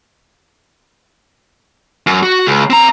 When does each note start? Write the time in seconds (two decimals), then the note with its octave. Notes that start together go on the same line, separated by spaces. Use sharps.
2.07 F#2
2.23 F#4
2.47 C#2
2.70 C4 A#5